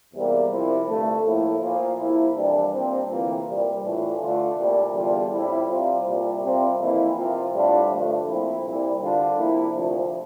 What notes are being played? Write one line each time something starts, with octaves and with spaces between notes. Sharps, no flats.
E2 C3 G3 A#3
C2 C3 F3 C4 E4
G2 D3 A3
A2 F3 A#3 E4
A#2 F3 A#3 F4
C3 F3 A#3 E4
F2 E3 G3 D4
A#2 G3 C4
D2 C3 E3 A#3 F4
C2 A#2 G3
A2 E3 A3 D4 F4
D3 A3 D4 F4
C2 A#2 G3
E2 D3 G3 D4 F4
A2 G3 C4 E4
C3 G3 C4 F4
C2 A#2 G3
C3 G3 C4 F4
F2 E3 A#3 E4
C3 F3 C4 F4
A2 G3 D4 F4
G2 D3 F3 A3
A#2 F3 C4 E4
C2 A#2 G3 C4 E4
D3 G3 D4 F4
C3 F3 A#3 E4
D2 C3 F3 A3 D4